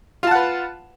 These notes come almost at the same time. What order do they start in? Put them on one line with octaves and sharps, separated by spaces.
F4 A5 F#5 B4